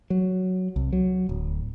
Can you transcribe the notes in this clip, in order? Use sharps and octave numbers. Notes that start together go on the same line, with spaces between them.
F#3
C2
F#3
D1